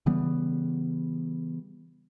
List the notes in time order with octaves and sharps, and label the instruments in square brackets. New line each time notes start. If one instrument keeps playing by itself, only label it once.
[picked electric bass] C#3 E3 G3 B3